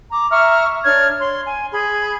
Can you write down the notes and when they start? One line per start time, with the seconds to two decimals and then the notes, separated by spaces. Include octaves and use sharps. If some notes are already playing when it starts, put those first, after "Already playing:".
0.11 A#5 D6
0.30 E5 A#5 C#6 F6
0.84 D4 C#5 F6 G#6
1.19 C#5 C6
1.46 G#5
1.72 G#4 B5